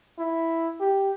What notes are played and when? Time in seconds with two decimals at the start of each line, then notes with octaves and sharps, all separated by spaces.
0.19 E4
0.80 G4